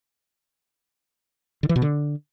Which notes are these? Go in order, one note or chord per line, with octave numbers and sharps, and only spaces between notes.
D3
E3
B2
D3